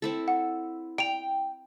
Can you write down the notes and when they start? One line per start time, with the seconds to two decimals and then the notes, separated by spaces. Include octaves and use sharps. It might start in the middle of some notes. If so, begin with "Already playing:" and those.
0.02 C4 E4 A4
0.28 F#5
0.98 G5 D7 F7